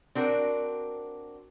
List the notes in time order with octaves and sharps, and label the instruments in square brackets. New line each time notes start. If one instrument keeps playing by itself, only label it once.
[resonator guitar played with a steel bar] C4 D4 F#4 A#4